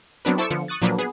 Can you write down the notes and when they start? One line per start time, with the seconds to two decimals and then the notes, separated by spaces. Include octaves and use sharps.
0.25 F#3 B3 C4 D4 A#4 B4
0.38 E4 A4 C5 C#6 D6 E6
0.50 D3 F3 B3 C#7
0.68 C#6 D#6 F#6 A6
0.82 A#2 F3 F#3 A#3 D4 B4
0.99 B3 G#4